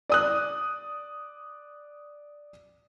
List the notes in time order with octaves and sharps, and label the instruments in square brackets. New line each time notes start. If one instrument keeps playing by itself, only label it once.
[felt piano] D5 D#6 F#6